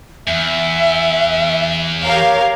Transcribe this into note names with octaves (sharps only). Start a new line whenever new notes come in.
E2 E5
G4 A#4 C#5 F5